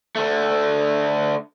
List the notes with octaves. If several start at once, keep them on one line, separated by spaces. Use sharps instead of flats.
D3 A3